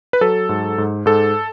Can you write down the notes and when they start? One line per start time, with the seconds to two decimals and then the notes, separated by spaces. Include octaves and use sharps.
0.13 B4
0.21 F#3 A4
0.49 G#2
0.78 G#2
1.06 G#2 A4